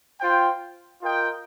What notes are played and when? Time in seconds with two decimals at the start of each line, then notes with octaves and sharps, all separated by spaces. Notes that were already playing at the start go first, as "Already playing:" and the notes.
0.20 F4 C5 G5
1.01 F4 A#4 D#5 G5